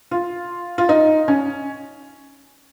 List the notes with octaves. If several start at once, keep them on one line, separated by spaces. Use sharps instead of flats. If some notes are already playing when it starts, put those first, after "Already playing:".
F4
F4
D#4
C#4